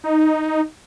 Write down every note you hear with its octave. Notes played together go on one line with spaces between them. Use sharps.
D#4